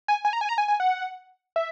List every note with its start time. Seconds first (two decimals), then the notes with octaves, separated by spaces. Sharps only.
0.08 G#5
0.25 G#5
0.33 A#5
0.41 G#5
0.49 A#5
0.58 G#5
0.68 G#5
0.80 F#5
1.56 E5